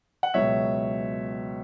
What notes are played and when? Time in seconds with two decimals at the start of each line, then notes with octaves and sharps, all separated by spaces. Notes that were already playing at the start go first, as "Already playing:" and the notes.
0.23 F#5
0.34 C#2 B2 F#3 C#5 E5